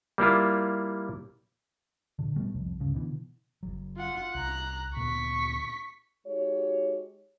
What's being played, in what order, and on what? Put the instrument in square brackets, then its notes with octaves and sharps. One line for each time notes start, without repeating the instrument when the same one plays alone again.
[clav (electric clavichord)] G3 A#3 E4 F4
[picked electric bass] A#2 D3
B2 G3 A3
C2 F2
C#2 G2 C#3
B2 D3 E3
[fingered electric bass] F#1 C2 F#3
[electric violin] F4 F#5
[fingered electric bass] C2 [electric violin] A#5 F#6
[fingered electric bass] D2 A#2 B3 [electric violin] C#6 B6
[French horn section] G#3 D#4 F#4 G4 C#5